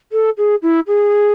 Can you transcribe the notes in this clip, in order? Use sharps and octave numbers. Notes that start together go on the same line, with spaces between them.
A4
G#4
E4
G#4